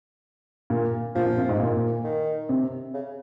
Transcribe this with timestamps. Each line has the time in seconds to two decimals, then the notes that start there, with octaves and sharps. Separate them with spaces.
0.70 A#2
1.15 A#2 F3
1.26 A#2
1.37 C3
1.49 G#2
1.60 A#2
2.04 D#3
2.49 C3
2.94 C#3